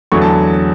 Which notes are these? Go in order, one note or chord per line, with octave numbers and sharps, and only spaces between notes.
E2 D3 F#3 A3 C#6
A5